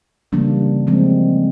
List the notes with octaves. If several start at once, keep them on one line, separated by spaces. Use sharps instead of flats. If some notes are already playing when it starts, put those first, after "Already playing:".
C#3 E3 G3 A#3 D4
F3 G#3 C4